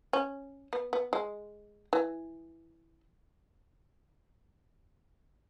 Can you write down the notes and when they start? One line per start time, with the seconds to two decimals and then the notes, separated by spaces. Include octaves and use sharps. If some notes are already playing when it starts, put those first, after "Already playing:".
0.13 C#4
0.73 B3
0.93 B3
1.13 G#3
1.93 E3